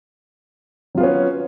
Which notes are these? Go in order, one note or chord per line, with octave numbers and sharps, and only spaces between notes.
F#3 B3 C#4 F4